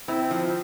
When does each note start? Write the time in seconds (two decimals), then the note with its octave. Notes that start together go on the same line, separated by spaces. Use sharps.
0.08 C4 E4
0.31 F3